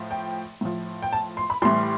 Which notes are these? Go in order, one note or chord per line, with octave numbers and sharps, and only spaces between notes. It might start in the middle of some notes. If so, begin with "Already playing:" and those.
Already playing: A2 F3
G5
A2 F3
G5
A5
C6
B5
A2 E3 G3 C6